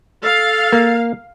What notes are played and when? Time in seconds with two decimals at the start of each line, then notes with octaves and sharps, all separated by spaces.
0.23 A4 F5
0.73 A#3